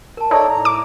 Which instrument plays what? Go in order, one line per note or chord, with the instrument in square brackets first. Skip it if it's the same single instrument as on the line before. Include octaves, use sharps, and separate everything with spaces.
[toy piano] A#4 A5
[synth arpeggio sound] D#4 [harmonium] A4 C#5 D5 [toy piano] E5 A5
[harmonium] A2 A#5
[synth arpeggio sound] D6